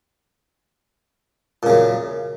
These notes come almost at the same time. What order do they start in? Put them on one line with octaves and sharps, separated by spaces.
A#2 C#3 F#2